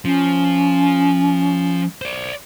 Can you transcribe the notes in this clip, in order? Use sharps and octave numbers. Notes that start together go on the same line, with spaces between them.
F3 C#4
C5 D5